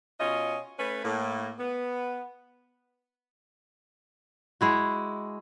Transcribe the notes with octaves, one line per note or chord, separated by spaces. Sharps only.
B2 C#4 F4 D#5
A3 C#4 B4
A2 A#3
B3
G#3 E4 F#4